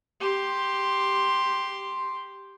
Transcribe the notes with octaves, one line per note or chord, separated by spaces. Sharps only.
G4 C6